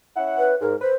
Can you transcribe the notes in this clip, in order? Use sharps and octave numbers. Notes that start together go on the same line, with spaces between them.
C#4 E4 F#5
B4
G#2 A#4
B4 C5